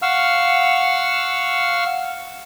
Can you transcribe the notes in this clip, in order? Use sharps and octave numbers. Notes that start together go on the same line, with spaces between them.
F5 F#5 C#6 E6 F6